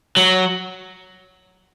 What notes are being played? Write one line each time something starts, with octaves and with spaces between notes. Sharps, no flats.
F#3